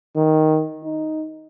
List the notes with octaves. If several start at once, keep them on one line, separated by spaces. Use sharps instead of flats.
D#3
D#4